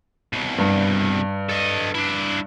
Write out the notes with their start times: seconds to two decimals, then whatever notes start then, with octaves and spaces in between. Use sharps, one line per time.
0.33 C2 B2
0.59 G2
1.49 A4 D#5
1.95 D4 E4